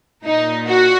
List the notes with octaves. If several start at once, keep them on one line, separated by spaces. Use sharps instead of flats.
A#2 D#4
F#4